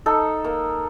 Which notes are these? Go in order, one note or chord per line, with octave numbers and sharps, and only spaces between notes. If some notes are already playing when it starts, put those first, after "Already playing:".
D#4 A4
A#3